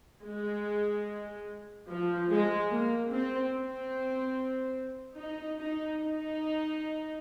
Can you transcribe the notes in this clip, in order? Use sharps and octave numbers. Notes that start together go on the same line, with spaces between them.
G#3
F3
G#3
A#3
C4
C4
D#4
D#4
D#4